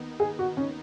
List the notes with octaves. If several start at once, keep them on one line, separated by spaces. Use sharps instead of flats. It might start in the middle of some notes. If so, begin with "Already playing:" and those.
Already playing: D#2 D#3 B3 D#4
G#4
F#4
C#4